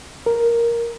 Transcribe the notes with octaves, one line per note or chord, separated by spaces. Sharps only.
A#4